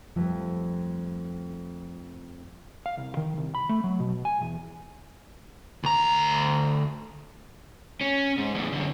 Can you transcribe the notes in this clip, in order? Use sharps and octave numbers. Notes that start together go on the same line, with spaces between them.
F2 F3 G3 A3
F5
C2
D#3
C2
B5
A3
F#3
B2
G#5
E2
D2 A#5
C#4
G#2
E2 A2
F#2 D3